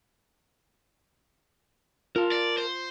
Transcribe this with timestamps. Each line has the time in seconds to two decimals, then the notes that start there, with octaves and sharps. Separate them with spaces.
2.16 F4 A#4 A5
2.32 D5
2.58 C5